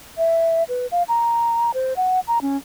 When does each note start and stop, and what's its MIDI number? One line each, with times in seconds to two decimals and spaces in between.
0.18 0.63 76
0.69 0.87 71
0.92 1.03 77
1.09 1.74 82
1.74 1.93 72
1.97 2.20 78
2.28 2.42 82
2.42 2.57 61